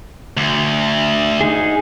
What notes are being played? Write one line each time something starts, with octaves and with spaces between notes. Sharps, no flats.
D2
D#4 G#4